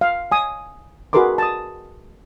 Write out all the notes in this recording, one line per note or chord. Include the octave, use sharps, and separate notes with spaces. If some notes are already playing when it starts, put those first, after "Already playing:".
F5
G#5 D#6
F#4 G#4 A#4 B4 C6 D6
A5 D#6